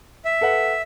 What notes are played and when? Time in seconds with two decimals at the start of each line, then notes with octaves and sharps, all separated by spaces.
0.25 E5
0.41 A4 B4 F#5